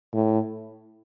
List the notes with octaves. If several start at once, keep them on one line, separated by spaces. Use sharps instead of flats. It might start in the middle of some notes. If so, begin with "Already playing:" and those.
A2